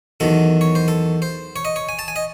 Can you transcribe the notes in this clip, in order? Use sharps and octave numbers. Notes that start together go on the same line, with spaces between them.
E2 D#3 F#3 A4
C#5
C5
A4
C5
C#5
D#5
C#5
G#5
A5
G#5
D#5